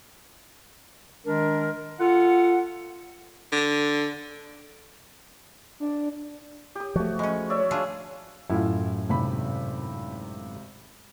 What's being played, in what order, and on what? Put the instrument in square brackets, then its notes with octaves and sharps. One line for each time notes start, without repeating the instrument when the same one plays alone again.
[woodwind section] D#3 G#3 D4 A#4
F4 A4 F#5
[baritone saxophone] D3
[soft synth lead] D4
[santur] G4 D#6
[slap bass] F3 A3 [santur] F#4
[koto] G#3 C#4 [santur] B5
[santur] C#5 D5 E5
[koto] D4 F4 G#4
[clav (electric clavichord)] F#2 A2 [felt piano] E4 F4
[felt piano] G#1 C3 B5